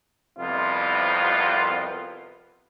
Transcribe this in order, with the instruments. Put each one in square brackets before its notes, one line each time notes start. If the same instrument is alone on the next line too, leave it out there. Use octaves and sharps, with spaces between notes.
[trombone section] C2 F2 C3 B3 F4